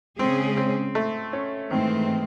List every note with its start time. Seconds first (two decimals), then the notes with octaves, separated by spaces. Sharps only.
0.19 C#3 G#3 C4 C#4 G#4
0.57 C4
0.95 A3
1.33 C#4
1.71 G#2 D#3 E3 A3 C4